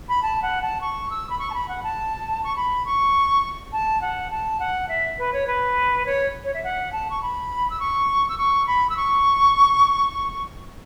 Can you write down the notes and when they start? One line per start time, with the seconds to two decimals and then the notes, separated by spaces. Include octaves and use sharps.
0.08 B5
0.22 A5
0.42 F#5
0.62 A5
0.81 C#6
1.10 E6
1.29 B5
1.38 C#6
1.50 A5
1.53 B5
1.68 F#5
1.83 A5
2.43 C#6
2.56 B5
2.85 C#6
3.72 A5
4.01 F#5
4.30 A5
4.59 F#5
4.88 E5
5.18 B4
5.33 C#5
5.47 B4
6.05 C#5
6.44 C#5
6.54 E5
6.63 F#5
6.92 A5
7.10 C#6
7.21 B5
7.70 E6
7.79 C#6
8.28 E6
8.37 C#6
8.66 B5
8.89 E6
8.97 C#6